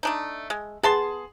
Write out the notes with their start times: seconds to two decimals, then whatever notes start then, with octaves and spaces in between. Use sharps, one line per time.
0.03 A3 D4 D#4
0.50 G#3
0.83 B3 G#4 A5 C6